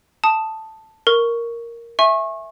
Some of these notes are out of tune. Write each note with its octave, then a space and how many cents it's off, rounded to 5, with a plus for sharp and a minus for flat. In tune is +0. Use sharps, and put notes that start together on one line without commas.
A5 +0 D#6 +0
A#4 +0 C#6 +5
E5 +0 G#5 +0 C#6 -30